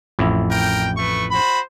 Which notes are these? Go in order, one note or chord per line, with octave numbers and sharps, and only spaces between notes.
A1 F2 E4
A#4 G5
A3 B4 C#6
F#4 C5 B5